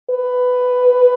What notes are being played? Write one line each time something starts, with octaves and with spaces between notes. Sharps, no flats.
B4